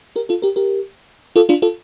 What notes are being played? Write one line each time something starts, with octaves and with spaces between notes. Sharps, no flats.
G4 A#4
F4 A4
G4 A#4
G4 A#4
F4 A4
D4 F4
F4 A4